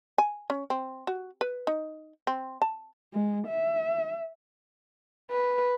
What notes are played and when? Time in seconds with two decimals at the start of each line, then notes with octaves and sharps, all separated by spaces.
0.18 G#5
0.50 C#4
0.70 C4
1.07 F#4
1.41 B4
1.67 D#4
2.27 C4
2.62 A5
3.14 G#3
3.47 E5
5.31 B4